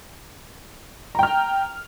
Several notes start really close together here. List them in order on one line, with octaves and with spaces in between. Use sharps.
A#5 G5 F6